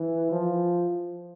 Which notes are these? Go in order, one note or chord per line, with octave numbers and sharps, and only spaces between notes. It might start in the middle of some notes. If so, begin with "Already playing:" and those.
Already playing: E3
F3